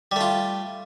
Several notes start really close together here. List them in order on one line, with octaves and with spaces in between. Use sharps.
G3 A3 F4